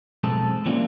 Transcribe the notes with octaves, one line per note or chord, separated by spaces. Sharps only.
B1 G#3 C4 G#4 A4 A5
E3 F#3 G3 A#3 C4 C#4